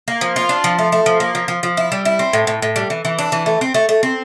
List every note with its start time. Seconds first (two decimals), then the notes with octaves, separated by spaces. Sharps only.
0.08 A#3
0.21 F3
0.36 F4
0.49 D4
0.64 F3
0.79 A3
0.92 A3
1.06 F3
1.20 A#3
1.35 F3
1.48 F3
1.63 F3
1.77 E4
1.92 G3
2.05 E4
2.19 C4
2.33 A2
2.47 A2
2.62 A2
2.76 G3
2.90 E3
3.05 E3
3.19 D4
3.32 E3
3.46 A3
3.61 C4
3.74 A3
3.89 A3
4.03 C4